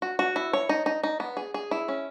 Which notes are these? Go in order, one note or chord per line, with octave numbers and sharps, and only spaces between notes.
F#4
F#4
E4
C#5
D#4
D#4
D#4
B3
G#4
G#4
E4
C#4